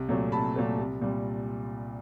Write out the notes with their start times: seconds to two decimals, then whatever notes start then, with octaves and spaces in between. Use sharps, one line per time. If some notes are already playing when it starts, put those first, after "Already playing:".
Already playing: C2
0.09 A#2 F#3 A3
0.32 C2 A5 B5
0.56 A#2 F#3 A3
0.78 C2
1.02 A#2 G3